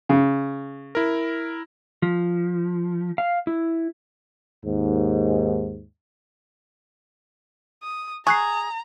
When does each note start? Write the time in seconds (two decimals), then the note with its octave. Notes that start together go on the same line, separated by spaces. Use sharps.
0.09 C#3
0.95 E4 A#4
2.02 F3
3.18 F5
3.47 E4
4.65 D#2 G#2
7.83 D#6
8.27 G#4 A#5 C#6 F#6 C7